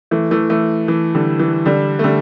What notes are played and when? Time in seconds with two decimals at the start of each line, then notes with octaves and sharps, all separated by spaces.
0.11 E3 A3
0.31 E3 A3
0.50 E3 A3
0.88 E3
1.14 D3 G3
1.39 E3
1.66 D3 G3
1.99 A3
2.04 D3 G3